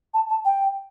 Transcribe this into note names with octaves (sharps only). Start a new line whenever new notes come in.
A5
A5
G5